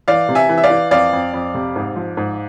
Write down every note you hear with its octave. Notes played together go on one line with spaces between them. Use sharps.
E3 D5 F5
C3
E5 G#5
E3
E5
D5 F5
E3
F2 D5 F5
F2
F2
C3
G#2
F3
G#2